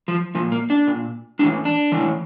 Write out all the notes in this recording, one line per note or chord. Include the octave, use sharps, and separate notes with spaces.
F3
A#2 F3
A#3
D4
A#2
A2 E3 D4
D4
A2 E3